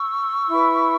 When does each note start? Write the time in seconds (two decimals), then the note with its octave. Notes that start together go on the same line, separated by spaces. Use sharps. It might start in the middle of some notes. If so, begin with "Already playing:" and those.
Already playing: C#6 E6
0.48 E4 B4